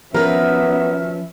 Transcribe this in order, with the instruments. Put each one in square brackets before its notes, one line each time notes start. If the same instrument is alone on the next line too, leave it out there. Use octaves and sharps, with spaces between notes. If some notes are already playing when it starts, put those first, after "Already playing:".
[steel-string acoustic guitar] F3 B4 [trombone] B3 [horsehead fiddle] C#4 E5 [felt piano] A#4